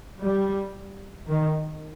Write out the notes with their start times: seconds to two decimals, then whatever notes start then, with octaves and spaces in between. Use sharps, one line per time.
0.22 G3
1.28 D#3